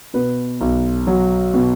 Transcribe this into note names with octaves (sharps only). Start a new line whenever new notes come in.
B2 B4
B1
F#3
B2